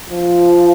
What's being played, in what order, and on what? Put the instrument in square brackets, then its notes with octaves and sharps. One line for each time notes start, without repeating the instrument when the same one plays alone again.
[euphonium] F3